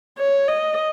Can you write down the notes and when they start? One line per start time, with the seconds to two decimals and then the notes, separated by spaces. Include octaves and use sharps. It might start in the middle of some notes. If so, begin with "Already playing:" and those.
0.18 C#5
0.48 D#5